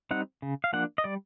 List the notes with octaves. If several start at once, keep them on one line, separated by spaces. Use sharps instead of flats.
G3 C4 D#4 F#5
C#3
F5
F3 A#3 D4 F#5
D#5
G3 D5